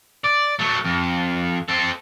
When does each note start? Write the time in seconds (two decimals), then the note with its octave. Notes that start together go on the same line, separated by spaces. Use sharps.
0.24 D5
0.59 F#3 A3
0.84 F2
1.68 C4 A4